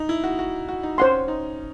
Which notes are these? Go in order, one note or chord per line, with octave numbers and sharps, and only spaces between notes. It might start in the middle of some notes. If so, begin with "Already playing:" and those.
Already playing: D#4
E4
F#4
F#4
F#4
D#4
C#4 C5 F#5 C6
D#4